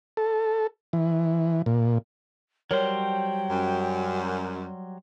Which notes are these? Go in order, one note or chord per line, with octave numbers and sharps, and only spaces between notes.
A4
E3
A#2
F#3 G3 A#4 C5 C#5 G5
F#2